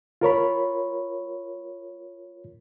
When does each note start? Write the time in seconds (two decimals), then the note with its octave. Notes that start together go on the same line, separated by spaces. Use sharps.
0.21 F4 A#4 C#5 B5